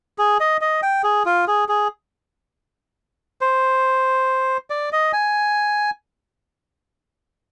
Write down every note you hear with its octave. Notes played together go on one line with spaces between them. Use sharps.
G#4
D#5
D#5
G5
G#4
F4
G#4
G#4
C5
D5
D#5
G#5